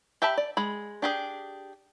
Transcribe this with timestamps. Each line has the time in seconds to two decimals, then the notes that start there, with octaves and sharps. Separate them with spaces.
0.22 G4 E5 G5 A5 B5
0.37 D5
0.57 G#3 B5
1.02 D4 G4 G#4